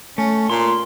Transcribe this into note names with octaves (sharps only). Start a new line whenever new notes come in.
A3 C#4
A#2 C6